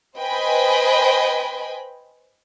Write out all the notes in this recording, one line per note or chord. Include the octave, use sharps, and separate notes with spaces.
B4 C5 D#5 G5 G#5 B5